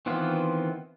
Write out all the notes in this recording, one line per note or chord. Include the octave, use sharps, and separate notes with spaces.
D#3 E3 B3 C4 F4